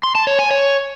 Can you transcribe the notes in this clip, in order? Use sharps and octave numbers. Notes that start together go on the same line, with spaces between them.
C6
A5
C#5
G#5
C#5